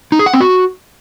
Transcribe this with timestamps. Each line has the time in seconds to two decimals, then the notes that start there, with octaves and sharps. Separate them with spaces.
0.12 D#4
0.19 G#4
0.26 F#5
0.33 C4
0.41 F#4